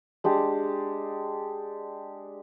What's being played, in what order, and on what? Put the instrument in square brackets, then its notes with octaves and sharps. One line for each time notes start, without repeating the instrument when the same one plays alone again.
[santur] G#3 D4 G4